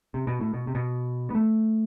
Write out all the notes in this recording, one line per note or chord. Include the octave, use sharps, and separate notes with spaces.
C3
B2
A2
B2
C3
B2
B3
A3